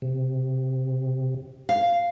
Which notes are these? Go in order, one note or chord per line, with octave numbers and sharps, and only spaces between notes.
C3
F5